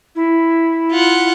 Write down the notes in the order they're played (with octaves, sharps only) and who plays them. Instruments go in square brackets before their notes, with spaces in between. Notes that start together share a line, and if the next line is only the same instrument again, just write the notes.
[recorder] E4
[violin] F4 F#5